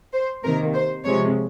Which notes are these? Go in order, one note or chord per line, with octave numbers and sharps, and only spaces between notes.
C5
C3 D#3 A#3 A#4
C5
C3 F3 G#3 C#5